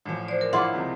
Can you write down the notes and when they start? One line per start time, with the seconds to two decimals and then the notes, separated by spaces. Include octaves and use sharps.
0.05 A1 F3
0.28 C5 D5
0.41 A#4
0.53 E4 F4 F#5 D6
0.73 C#2 C3 F3